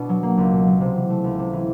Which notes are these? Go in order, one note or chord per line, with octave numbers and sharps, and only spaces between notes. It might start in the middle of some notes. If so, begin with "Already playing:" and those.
Already playing: B2 B3 D4
F#3
A#3
C#2
B2
F#3
C3
E3
A3
C#2
C3
E3